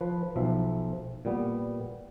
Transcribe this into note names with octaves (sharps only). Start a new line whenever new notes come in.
F3 B4
B1 F3 E5
A#2 G3 B3